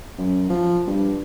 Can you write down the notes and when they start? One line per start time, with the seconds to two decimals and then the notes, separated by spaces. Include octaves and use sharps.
0.18 F#2
0.50 F3
0.87 G2